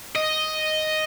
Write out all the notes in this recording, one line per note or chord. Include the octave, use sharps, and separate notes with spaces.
D#5